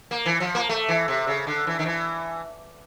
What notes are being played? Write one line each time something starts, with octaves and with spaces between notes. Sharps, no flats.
A#3
E3
F3
A#3
A3
E3
C3
C#3
D3
E3
D#3
E3